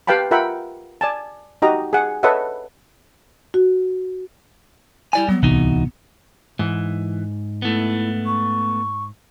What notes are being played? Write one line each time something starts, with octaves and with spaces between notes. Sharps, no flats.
G4 B4 F5 G5 A5 B5
F4 A#4 E5 F#5 G5 B5
D5 G#5 A5
D#4 F#4 G4 D#5 A#5
G#4 F#5
A4 B4 C#5 D#5 E5 F#5
F#4
G3 E4 D5 G#5
F#3 G3 B3
D1 C2 C3 E3 D#4 F#4
G#2 E3
A3 B3 E4
C#6